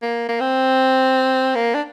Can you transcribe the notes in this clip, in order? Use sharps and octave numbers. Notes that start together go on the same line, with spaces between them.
A#3
A#3
C4
A#3
D4